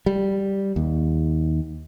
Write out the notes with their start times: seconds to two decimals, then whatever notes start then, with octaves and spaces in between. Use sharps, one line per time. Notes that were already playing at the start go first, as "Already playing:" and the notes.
0.06 G3
0.76 D#2